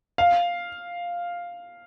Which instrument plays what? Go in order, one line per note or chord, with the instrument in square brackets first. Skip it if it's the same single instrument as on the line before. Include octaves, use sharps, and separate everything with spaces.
[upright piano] F5